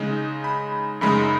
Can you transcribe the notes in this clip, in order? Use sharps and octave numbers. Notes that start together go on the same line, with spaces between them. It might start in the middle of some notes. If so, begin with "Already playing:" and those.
Already playing: C#3 G#3 D#4
B5
F#2 C#3 G#3 D#4 B5